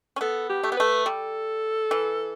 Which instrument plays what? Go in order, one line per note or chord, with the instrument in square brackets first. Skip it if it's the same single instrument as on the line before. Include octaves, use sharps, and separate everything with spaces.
[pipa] C#4
[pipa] B3 [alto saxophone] A4
[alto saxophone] G4
[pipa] A3
B3
[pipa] A3 [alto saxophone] B4
[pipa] G3 [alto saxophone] A4
[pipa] E3